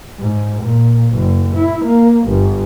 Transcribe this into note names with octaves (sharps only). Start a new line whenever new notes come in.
G#2
A#2
F#1
E4
A#3
G1